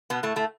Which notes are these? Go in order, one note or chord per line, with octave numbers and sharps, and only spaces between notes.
B2 B3
A2 A3
A2 A3